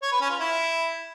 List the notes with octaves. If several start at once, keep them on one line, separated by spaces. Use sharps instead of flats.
C#5
B4
C#4
F4
E4